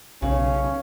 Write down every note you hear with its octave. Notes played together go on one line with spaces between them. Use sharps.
B1 C#3 C#4